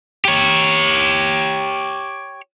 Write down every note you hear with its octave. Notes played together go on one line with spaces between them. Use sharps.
G4 C#5